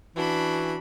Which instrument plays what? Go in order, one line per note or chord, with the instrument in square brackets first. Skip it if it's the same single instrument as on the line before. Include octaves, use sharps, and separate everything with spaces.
[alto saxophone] E3 [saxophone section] C#4 F#4 [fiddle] D4 B5